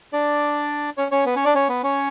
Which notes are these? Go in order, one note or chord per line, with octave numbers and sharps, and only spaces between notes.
D4 D5
C#4 C#5
C#4 C#5
B3 B4
C#4 C#5
D4 D5
C#4 C#5
B3 B4
C#4 C#5